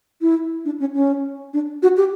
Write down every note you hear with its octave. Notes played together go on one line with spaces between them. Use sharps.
E4
D4
C#4
C#4
D4
F#4
G4